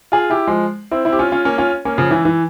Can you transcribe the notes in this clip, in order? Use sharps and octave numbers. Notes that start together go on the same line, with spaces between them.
F4 G#4
E4 G4
F3 G#3
C4 E4
C4 E4
G4
C#4 F4
C#4 F4
A#3 C#4
C#4 F4
A#3 C#4
C#3 F3
E3
E3